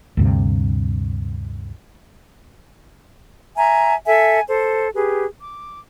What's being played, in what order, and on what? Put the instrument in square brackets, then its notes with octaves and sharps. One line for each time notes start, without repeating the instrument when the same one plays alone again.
[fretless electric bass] D2 G2 C3
[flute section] E5 G#5 A#5
A4 E5 G#5
A4 C5
G4 G#4 B4
D6